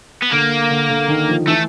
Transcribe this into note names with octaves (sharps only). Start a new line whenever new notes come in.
B3
D3 A#3
D3
D3
D#3
F3
E3 A3